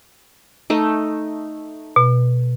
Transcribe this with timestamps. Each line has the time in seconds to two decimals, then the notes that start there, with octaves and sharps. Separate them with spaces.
0.70 A3 D#4
1.96 B2